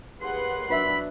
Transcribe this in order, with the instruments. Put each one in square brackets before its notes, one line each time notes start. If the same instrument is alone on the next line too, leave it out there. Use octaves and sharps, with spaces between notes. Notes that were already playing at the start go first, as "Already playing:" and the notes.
[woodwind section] D#2 C6 [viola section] G#4 B4 F#5
[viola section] F#3 D4 [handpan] B4 E5 [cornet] B5